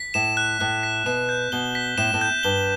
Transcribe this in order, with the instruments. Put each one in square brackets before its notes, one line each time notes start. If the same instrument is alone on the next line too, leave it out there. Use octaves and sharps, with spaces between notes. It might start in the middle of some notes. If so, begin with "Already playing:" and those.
Already playing: [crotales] B6
[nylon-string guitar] A2 [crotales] E7
[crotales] F#6
[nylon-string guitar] A2 [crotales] F#6
[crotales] B6
[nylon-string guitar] B2 [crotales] E7
[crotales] G6
[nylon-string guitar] B2 [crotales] G7
[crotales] B6
[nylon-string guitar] A2 [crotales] E7
[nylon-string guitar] A2
[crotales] G6
[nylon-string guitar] G2 [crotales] G7